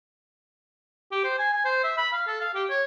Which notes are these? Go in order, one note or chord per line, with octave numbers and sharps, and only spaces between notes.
G4
C5
G#5
G#5
C5
E5
B5
F5
A4
F5
G4
C#5